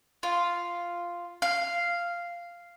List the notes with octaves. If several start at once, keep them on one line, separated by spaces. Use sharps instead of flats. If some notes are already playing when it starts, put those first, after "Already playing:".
F4
F5